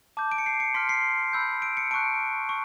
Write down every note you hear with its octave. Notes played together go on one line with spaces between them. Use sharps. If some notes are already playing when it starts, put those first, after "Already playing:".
A5 D6 G6
D7
C#7
C7
C#7
C6 F6 B6
C7
B5 E6 G6
D7
C#7
A5 C#6 F#6 D7
C#6